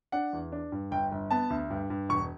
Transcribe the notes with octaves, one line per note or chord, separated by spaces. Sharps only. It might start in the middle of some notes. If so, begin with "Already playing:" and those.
D4 F#5
E2
D4
G2
G1 G5
G1
B3 A5
D2
G2
G2
E1 C#6